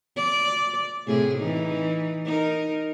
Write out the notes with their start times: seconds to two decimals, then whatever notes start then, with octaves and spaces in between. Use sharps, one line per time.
0.17 D5
1.07 A2 C3 G#4
1.38 E3 D#4
2.26 D#4 A#4